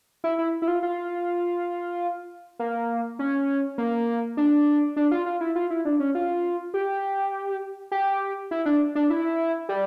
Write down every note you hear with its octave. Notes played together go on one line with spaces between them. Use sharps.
E4
E4
E4
F4
F4
A#3
C#4
A#3
D4
D4
F4
F4
E4
F4
E4
D4
C#4
F4
G4
G4
E4
D4
D4
E4
G3